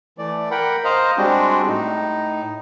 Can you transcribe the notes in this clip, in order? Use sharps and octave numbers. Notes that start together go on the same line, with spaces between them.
E3 A3 D5
A#4 F#5 G5 B5
C5 D#5 F5 A#5
G3 G#3 C4 D4 F#4
A2 D#4